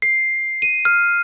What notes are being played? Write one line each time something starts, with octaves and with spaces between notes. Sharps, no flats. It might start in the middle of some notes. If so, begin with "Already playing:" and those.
C7
D#7
F6